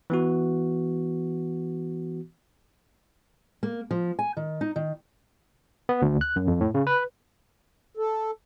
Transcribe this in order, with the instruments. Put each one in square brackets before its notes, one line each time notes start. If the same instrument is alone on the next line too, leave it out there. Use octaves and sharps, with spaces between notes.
[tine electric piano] E3 B3 F#4
[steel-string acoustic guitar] A#3
F3
G#5
D#3
D#4
D#3
[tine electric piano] B3
D2
F#6
F#2
F2
A2
C#3
B4
[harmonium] A4